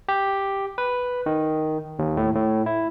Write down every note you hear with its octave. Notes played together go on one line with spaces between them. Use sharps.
G4
B4
D#3
D#2
A2
A2
E4